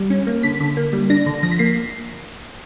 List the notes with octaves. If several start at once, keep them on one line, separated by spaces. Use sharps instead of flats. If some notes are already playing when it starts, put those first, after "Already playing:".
Already playing: G3
C#4
A#3
D3 B6
D3
A#3
G3
D4 A#6
D3
F3 A#6
B6
A#3 C7